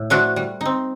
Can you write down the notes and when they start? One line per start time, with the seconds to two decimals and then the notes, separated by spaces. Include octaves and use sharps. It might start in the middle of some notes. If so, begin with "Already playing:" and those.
Already playing: A2
0.10 F3 A3 D4 F#4
0.36 G3
0.61 C4 D#4